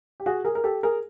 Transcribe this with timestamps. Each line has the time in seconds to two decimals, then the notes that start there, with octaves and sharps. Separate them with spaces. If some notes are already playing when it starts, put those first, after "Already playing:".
0.20 G4
0.26 F#4 G#4
0.45 G#4 A#4
0.55 A#4
0.64 G4 A4
0.83 G#4 A#4